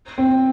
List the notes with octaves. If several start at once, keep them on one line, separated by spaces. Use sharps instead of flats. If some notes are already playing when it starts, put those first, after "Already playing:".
C4